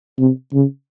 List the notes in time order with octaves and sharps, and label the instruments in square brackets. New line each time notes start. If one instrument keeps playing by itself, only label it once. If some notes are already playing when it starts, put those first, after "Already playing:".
[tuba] C3
C#3